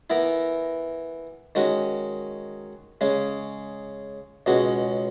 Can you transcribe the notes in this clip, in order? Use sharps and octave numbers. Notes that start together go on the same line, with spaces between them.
E3 B3 E4 A#4
D#3 G#3 C#4 F#4
C#3 G#3 C#4
C#2 B2 G#3 C#4 F#4